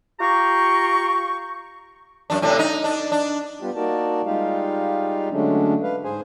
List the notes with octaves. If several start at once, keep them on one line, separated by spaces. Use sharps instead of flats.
F4 G4 G5 A#5 C#6
F#2 D4
A2 C3 D4
D#4
D4
D4
G3 B3 F4 G4
A#3 D#4 F#4 A#4 D5 A5
G3 G#3 D#4 F4 G4 F5
D3 F#3 G#3 A3 C#4 D4
B4 F5
G#2 G#4 C5 G#5